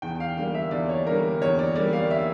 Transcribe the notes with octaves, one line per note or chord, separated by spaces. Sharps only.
E2 G5
F5
D3 G3 A#3 F5
E5
E2 D5
C#5
D3 G3 A#3 A#4
E2 C#5
D5
D3 G3 A#3 D5
F5
E5